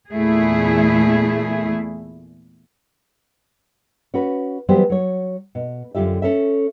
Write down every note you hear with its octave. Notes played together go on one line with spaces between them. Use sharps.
E2 A#2 A3 E4 G#4
C#4 F#4 B4
E3 F#3 G3 B3 G4 C5
F#3 C#5
B2
F#2 D3 F4 G4 E5
C#4 A4 E5